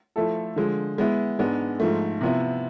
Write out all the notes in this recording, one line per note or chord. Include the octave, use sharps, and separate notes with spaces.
F3 A3 E4 A4
D3 F3 G#3
G#3 B3 E4
G#2 G#3 B3 D4
G#2 F3 A3
C3 F3 B3 E4